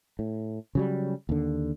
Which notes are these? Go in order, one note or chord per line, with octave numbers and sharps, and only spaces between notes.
A2
C#3 F#3 G3
D#2 D3